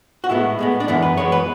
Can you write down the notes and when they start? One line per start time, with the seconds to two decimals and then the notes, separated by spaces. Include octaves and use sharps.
0.24 F#4
0.29 A2 G#3 B3 E4
0.59 A2 G#3 B3
0.80 D4
0.88 F#2 E3 G#3 B3 E4
1.02 B4
1.17 F#2 E3 G#3 B3 C#5
1.32 B4